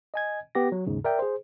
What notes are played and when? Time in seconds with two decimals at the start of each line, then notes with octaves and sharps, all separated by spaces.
0.14 D#5 G#5 G#6
0.55 B3 G4 A#6
0.72 F#3
0.86 D#2 G#2 C#3
1.04 A#4 D5 E5 G5
1.19 G#4 C5